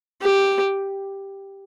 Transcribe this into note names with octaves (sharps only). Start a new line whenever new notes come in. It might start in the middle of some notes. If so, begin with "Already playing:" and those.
G4